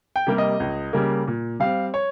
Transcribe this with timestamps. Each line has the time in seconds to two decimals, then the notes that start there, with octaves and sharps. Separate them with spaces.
0.16 G5
0.27 C3 G3 A#3
0.38 D#5
0.60 C#2
0.93 C#3 G3 A#3
1.28 A#2
1.60 G3 C4 F5
1.94 C#5